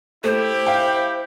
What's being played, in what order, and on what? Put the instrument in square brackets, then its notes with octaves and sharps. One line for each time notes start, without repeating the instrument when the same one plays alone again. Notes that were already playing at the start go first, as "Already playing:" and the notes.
[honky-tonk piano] A3 [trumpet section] E4 G4 [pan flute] C5
[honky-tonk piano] F5 G5